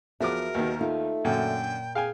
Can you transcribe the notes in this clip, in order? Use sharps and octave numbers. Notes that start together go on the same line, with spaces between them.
E2 F3 F#4 G#4 A#4 E5 D6
D#2 B2 D#3
A3 D#4 F4
F#2 A#2 D3 G5
G#4 F5 G5 G#5